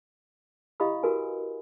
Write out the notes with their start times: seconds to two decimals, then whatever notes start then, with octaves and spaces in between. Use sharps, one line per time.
0.80 E4 G4 D#5 F5 B5 D#6
1.03 F#4 A#4 B4 G#5